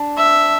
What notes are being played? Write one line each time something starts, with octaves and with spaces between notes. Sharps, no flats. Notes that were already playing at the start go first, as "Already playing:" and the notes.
Already playing: D4
E5